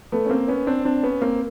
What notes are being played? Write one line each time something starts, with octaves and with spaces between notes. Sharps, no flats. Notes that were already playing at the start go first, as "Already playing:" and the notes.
A3 B3
C#4
A#3 C4
B3 C#4
C4 D4
C4 D4
B3 C#4
A#3 C4